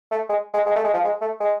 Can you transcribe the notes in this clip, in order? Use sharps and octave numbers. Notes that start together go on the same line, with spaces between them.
A3
G#3
G#3
G#3
A3
G#3
F3
G#3
A3
G#3